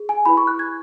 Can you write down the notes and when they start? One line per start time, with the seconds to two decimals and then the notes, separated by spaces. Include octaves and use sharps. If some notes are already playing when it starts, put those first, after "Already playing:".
Already playing: G#4
0.09 G#5
0.25 E4 B4 B5
0.37 C#6
0.47 F#6
0.59 G#6